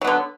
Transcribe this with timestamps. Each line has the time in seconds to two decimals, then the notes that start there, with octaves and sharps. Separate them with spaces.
0.02 F#3
0.04 B3
0.07 D3